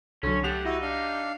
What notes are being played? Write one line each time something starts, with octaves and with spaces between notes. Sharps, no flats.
C2 D3 F#3 C#4 C#5
A3 D4 G4 F#5 F7
D#4 E4 F#4
D4 F5